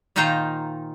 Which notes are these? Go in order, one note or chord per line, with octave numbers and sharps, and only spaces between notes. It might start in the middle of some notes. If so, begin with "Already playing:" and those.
A#2 D#3 D#4 F4 C5 A#5